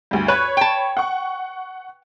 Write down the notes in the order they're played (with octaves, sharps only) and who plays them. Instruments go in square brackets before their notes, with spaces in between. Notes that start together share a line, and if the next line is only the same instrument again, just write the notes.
[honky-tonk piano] D2 G2
[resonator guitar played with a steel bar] B4 [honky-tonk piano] C#5 B5
[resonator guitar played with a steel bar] G5 A5
[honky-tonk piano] F#5 C#6